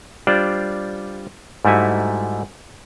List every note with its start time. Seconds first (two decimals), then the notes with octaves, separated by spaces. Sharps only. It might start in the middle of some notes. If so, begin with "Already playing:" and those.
0.27 G3 D4 F4 C5 D5
1.65 G#2 G3 A3 E4 F#4 G#5